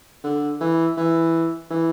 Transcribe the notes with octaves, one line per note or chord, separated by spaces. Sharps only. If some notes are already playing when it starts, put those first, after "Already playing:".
D3
E3
E3
E3